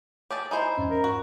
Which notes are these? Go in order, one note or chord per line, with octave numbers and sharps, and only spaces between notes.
G4 G#4 C#5 A5
D#4 E4 C5 G#5
E2 G#2 C#4
A#4
F#4